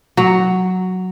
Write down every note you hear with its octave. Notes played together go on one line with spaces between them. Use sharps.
F#3